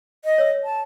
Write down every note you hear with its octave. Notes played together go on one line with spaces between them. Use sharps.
D#5
C#5 E6
A5